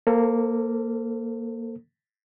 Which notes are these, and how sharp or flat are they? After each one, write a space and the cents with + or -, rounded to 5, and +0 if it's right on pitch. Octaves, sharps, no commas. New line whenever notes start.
A#3 +0 A4 +25 C5 +0